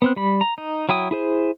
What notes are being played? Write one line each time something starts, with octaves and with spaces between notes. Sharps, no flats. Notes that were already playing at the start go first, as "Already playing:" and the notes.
B3 C4 F#6
G3 B5
A#5
D#4
F#3 E4 G5 D#6
E4 G#4 C5